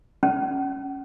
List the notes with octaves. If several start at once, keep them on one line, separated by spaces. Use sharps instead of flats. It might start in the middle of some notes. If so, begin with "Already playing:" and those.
C#4